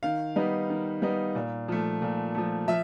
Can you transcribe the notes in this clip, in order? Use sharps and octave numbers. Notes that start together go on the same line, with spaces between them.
D#3 F5
G3 B3 D#4
D#3
G3 B3 D#4
A#2
F3 A3
A#2
F3 A3
F3 E5